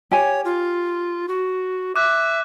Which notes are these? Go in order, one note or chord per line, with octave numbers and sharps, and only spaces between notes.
G4 C#5 G#5
F4
F#4
E5 D6 F#6